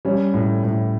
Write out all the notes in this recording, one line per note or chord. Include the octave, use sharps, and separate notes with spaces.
G3 C#4
A2
A2